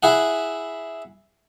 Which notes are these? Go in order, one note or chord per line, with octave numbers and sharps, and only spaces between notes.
E4 G#4 F#5